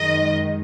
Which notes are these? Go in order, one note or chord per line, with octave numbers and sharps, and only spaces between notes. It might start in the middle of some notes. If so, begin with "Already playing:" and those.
Already playing: F#2 D#3 G#3 D#5